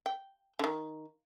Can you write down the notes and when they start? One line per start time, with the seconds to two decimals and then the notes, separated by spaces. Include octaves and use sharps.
0.06 G5
0.59 D3 D#3